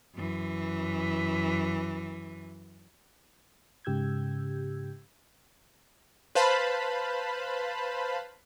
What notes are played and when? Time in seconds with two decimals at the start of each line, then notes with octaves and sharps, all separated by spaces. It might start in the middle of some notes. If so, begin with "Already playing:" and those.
0.15 F#2 E3
3.85 G#2 C#3 G4 E6 G6 G#6
6.35 B4 C5 F5 A5 B5